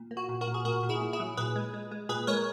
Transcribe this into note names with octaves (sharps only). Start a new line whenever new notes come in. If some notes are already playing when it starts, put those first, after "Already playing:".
Already playing: A#2
A#3
F#4
A#2
F#4 A#4
A#2
G#4
A#2 F#4 A#4
A#2
E4 G#4
A#2
E4 G#4
F#3
A#2 G#4 B4
G#3
G#3
G#3
A#2 G#4 B4
G#3 A#4 C#5